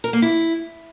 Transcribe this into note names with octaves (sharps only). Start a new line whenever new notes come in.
A#4
A#3
E4